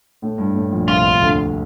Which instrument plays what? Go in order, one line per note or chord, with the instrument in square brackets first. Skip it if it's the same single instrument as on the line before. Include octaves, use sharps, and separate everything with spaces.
[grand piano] A2
G2
A2
A#1 A#2
[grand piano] C2 C3 [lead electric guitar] F4
[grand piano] D2 D3